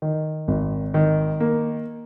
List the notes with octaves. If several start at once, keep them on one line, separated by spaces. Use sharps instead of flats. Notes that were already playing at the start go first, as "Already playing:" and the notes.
D#3
G#1
D#3
A#3